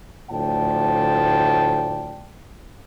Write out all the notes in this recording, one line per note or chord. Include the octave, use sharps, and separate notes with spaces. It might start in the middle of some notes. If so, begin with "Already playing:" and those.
D2 A2 F3 D5 G5 A5